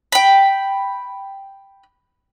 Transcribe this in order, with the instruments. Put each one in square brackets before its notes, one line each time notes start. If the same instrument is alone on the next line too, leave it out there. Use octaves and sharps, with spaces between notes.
[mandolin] G5 B5